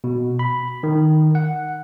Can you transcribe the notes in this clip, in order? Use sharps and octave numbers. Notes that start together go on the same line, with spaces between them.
B2
B5
D#3
F#5